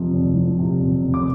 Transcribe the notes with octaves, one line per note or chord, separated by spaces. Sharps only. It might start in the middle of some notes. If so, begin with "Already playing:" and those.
Already playing: F2 C3 F3
F1
F3
C3
F2
F1
D6